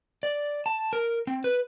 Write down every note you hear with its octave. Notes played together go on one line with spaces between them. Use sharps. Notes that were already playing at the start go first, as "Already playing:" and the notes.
D5
A5
A#4
C4
B4